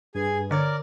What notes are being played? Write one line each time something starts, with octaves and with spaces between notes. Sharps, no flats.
G2 G#4 B4 G#5
D3 A#4 C#5 D5 G#6